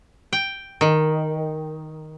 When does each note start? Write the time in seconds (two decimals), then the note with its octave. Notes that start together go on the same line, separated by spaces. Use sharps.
0.33 G5
0.81 D#3